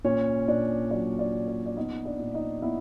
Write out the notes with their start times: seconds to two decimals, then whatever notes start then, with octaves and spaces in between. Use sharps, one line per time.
0.04 A#2 C#4 C#5
0.48 A#2 D4 D5
0.91 F#3 D4 D5
1.19 D4 D5
1.34 C#4
1.48 D4 D5
1.66 D5
1.77 B3 D#4 D#5
2.05 D4 D5
2.19 A#2
2.34 D#4 D#5
2.62 B3 E4 E5